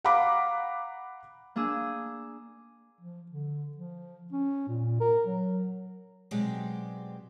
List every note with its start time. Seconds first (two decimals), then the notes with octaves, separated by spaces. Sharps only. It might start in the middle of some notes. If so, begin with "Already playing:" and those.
0.05 F5 F#5 A#5 B5 D6
1.56 A#3 D4 G#4 E6
3.00 F3
3.31 D3
3.77 F3
4.32 C#4
4.68 A#2
5.00 A#4
5.26 F#3
6.31 B2 F#3 G#3 C4 G4 D5